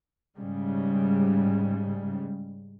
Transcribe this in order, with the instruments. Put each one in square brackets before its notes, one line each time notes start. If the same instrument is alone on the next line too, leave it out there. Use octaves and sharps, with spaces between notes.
[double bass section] G#2 C#3 G3